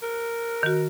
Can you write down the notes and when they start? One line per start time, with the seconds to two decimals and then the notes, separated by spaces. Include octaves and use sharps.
0.02 A#4
0.63 D#3 F#4